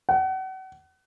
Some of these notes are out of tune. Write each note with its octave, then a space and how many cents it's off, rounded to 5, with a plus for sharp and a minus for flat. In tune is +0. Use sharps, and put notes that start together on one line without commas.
F#5 +35